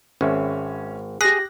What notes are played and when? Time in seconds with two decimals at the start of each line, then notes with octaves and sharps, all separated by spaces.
0.21 G#1 C#4 E5
1.21 G4 G#4 F#6 A#6